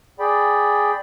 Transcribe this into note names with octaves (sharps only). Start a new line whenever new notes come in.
G#4 D5 G5 B5